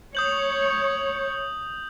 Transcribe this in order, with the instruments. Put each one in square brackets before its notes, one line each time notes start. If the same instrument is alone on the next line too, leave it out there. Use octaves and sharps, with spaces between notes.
[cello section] C#5 [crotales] D#6 G6 F#7